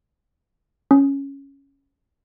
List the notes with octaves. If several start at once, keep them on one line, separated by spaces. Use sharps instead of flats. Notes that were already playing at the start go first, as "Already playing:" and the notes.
C#4